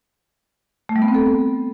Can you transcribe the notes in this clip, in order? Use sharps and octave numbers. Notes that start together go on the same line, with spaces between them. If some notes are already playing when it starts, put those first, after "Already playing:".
A3
G3
B3
C4
A4